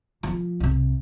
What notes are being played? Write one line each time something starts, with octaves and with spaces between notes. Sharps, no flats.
E3 F3
C2 C3